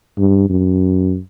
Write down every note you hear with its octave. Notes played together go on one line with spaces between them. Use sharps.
G2
F#2